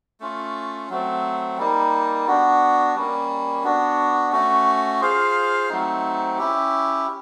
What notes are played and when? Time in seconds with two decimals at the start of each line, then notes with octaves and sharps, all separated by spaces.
0.20 A3 C#4 F4
0.89 F#3 A3 C4
1.58 G3 A#3 D#4
2.27 B3 D4 F#4
2.95 G3 A#3 C#4
3.64 B3 D4 F#4
4.32 A3 C#4 F#4
5.01 F4 G#4 C5 F5
5.69 F#3 A3 C4 D#4
6.38 C#4 E4 G4